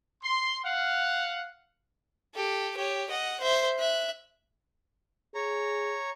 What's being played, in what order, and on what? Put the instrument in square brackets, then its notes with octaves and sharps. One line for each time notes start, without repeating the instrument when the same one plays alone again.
[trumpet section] C6
F5 F#5
[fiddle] G4 A4
G4 C#5
D#5 F#5
C5 E5
E5 F#6
[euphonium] G#4 [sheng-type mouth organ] C#5 A#5